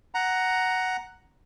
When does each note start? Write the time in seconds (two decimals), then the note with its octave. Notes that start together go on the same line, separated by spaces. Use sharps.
0.15 F#5 A#5